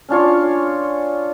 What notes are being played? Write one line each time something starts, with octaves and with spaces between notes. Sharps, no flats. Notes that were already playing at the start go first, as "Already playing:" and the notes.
C#4 D4 F4 C#5